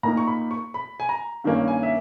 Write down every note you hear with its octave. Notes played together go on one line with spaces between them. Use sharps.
A#2 A#3 D#4 A#5
C#6
B5
C#6
B5
G#5
A#5
G2 D#3 G3 A#3 C#4
G#5
E5